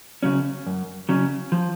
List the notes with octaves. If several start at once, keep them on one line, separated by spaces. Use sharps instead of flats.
C#3 F#3 C#4
F#2
C#3 F#3 C#4
F3